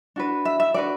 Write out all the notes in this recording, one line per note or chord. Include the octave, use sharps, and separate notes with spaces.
D4 F#4 B4
E5
E5
D4 F#4 B4 D5